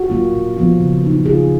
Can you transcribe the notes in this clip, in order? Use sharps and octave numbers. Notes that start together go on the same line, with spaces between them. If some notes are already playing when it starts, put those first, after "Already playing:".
Already playing: F#4
F#3 A#3 F4
A#2
F3 B3 F4
C#3
F#3 A#3 D#4
C#3 F4 G#4